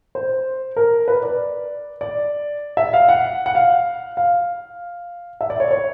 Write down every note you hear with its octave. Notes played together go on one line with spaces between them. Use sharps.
C5
A#4
B4
D5
D5
E5
F5
F#5
F#5
F5
F5
E5
D5
C#5
C#5